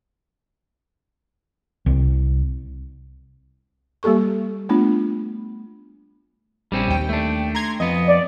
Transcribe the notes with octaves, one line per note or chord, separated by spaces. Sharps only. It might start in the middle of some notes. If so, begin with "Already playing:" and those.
C2
G3 A#3 G4 A4 C#6
A3 B3 D4 F4
A#1 G3 C4 C#4
D#2 G5
A3 D4
A#5 C6 G#6
F2 B3 D#5
D5